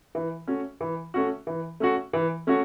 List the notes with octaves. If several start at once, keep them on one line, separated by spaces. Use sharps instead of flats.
E3
A3 C#4 F#4
E3
A3 C#4 F#4
E3
A3 C#4 F#4
E3
A3 C#4 F#4